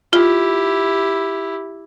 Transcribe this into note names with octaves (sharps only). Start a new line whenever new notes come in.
E4 F4 G4